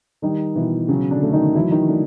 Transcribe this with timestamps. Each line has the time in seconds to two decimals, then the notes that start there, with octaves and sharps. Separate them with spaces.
0.22 D#3 G3 D#4
0.55 B2 E3 E4
0.88 C#3 F#3 C#4
1.11 D3 D4
1.23 A3
1.33 D#3 D#4
1.55 E3 F#3 E4
1.71 D#3 D#4
1.88 D3 A3 D4